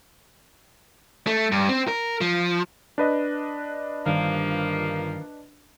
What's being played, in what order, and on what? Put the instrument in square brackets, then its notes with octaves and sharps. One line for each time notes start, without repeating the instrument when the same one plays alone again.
[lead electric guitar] A3
G2
C4
A#4
F3
[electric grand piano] D4 B4 D#5
[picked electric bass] G1 G2 [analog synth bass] D#3 [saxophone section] F3 A#3